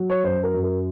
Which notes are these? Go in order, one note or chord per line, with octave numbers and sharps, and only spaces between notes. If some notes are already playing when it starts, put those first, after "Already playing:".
Already playing: F#3
C#5
F#2 C5
A#4
F#2
A#4